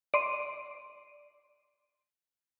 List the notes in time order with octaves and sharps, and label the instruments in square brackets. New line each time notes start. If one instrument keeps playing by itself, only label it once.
[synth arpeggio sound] D5 C6 D#7